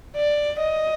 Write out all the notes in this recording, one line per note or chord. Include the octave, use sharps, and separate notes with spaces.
D5
D#5